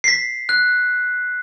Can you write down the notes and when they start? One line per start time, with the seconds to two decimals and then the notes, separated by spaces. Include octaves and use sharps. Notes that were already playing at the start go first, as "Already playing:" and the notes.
0.04 B6 C7
0.49 F#6